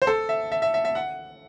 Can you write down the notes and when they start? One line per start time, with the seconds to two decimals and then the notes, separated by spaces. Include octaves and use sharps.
0.02 C5
0.07 A4
0.29 E5
0.52 E5
0.62 E5
0.74 E5
0.85 E5
0.95 F#5